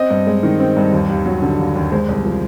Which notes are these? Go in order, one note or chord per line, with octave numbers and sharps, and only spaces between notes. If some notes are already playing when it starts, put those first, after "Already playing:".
Already playing: C4 D#5
G2
G#3
D#3
C4
G2
D#2
D#2
F#3
D3
D#2
D#2
G#3 C5
C2
F3